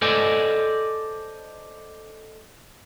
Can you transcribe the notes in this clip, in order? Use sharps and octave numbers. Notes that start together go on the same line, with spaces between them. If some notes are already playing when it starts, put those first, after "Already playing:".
A4 C5 D5 D#5 G#5